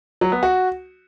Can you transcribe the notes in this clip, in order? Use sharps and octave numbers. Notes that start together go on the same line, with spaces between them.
F#3
B3
F#4